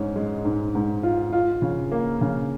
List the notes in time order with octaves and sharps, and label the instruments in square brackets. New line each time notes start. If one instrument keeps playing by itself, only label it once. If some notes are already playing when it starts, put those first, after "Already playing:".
Already playing: [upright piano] G#2 C#4
G#3
G#2
G#2
F4
F4
C#3
A#3
C#3